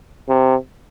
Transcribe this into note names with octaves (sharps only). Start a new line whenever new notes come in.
C3